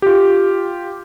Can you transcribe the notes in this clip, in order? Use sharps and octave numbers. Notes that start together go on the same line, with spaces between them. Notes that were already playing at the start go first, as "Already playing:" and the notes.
F4 G4